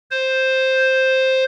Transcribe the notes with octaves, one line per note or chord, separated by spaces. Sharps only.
C5